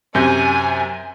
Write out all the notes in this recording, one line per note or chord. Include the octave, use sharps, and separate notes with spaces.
F#2 C3 G#5 G6